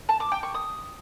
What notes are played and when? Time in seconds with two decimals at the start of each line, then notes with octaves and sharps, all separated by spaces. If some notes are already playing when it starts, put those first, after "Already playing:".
0.09 A5
0.20 D6
0.32 G5
0.43 C#6
0.54 D#6